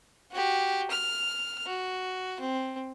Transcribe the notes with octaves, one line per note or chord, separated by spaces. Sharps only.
F#4 G4
F6
F#4
C4